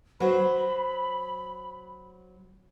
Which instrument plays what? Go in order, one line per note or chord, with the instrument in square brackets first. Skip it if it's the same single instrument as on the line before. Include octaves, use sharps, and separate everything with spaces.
[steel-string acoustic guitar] F#3 C5 [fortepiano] F#4 B4 [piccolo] B5